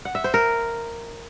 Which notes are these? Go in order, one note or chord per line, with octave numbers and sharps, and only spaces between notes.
F#5
E5
C5
A#4